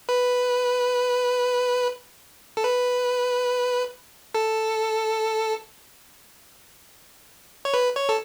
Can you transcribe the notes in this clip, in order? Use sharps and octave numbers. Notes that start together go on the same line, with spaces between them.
B4
A4
B4
A4
C#5
B4
C#5
A4